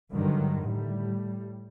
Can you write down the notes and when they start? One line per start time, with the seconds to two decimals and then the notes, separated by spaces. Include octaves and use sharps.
0.10 G2 D3 D#3 F#3
0.62 A2 G3